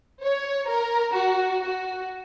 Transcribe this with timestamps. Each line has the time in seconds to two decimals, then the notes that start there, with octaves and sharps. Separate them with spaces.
0.22 C#5
0.68 A#4
1.15 F#4
1.62 F#4